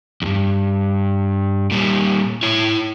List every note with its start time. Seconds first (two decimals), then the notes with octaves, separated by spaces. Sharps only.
0.22 E2 G2
1.71 A#2 G3
2.43 E4 C#5